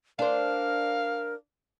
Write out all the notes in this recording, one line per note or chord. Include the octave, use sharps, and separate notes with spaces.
D4 A#4 C5 F5